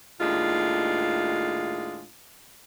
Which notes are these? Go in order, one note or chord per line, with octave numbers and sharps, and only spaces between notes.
D#2 A2 G#3 D4 F4